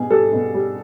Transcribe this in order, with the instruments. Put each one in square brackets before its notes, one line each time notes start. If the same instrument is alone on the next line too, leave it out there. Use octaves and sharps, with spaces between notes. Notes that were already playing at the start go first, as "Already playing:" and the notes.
Already playing: [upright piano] B2 G3 G#4
G3 A4
B2
G3